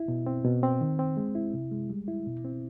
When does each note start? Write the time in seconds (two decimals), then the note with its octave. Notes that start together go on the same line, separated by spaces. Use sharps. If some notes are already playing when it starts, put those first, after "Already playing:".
Already playing: E4
0.08 B2
0.26 C4
0.45 B2
0.63 C4
0.81 D#3
0.99 C4
1.17 G#3
1.35 E4
1.53 C3
1.72 G#3
1.90 G3
2.08 E4
2.26 B2
2.44 C4